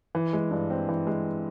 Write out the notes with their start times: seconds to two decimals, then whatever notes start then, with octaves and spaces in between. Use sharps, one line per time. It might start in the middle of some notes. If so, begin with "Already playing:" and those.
0.15 E3
0.33 G#3
0.51 G2
0.70 C4
0.89 E3
1.07 G#3